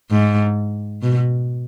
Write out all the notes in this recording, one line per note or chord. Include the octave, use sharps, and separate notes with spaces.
G#2
B2